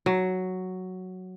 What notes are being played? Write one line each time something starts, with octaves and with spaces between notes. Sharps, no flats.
F#3